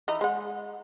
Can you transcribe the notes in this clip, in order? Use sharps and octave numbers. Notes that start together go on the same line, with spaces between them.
E3 D#4 E4
G#3 F#5